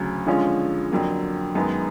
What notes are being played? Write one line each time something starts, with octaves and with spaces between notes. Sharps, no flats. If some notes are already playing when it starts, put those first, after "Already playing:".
Already playing: D2 C#3 F#3
D3 F3 G#3 C#4 F4
F2 D3 F#3 A#3
F#2 D#3 G#3 B3